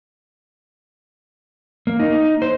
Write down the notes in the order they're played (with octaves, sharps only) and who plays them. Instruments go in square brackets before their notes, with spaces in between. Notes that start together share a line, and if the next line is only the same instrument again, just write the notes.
[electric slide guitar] A#3
D#4
C5